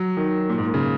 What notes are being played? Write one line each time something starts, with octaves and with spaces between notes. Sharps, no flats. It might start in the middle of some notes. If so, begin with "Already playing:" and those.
Already playing: F#3
D#3
A#2
G#2
A#2
C#3